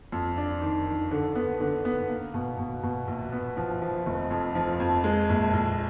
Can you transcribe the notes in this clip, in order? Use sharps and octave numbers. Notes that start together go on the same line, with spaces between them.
F2
D4
D#3
D#3
D3
B3
D3
B3
A#3
B2
B2
B2
A#1
B3
F3
F3
F1
F2
F3
F2
G#3
A#1
A#1